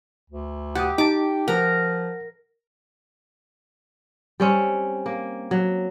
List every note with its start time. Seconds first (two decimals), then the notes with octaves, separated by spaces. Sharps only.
0.30 D2
0.75 G4 F#5 D#6
0.98 D#4 G4 A5 D6
1.48 F3 A#4 F#5
4.40 G3 C4 C#4
5.06 A#3
5.51 F#3